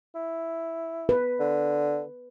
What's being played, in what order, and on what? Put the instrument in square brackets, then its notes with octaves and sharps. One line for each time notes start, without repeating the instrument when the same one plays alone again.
[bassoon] E4
[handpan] B4
[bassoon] D3